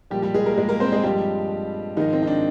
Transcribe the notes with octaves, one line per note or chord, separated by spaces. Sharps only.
A#2 F3 G3 G#3 G4
G3 G4
G#3 G#4
A#3 A#4
G#3 G#4
A#3 A#4
C4 C5
G#3 G#4
G2 F3 G3 G#3 G4
G#2 D#3 F3 G#3 D#4
C4
D#4
D4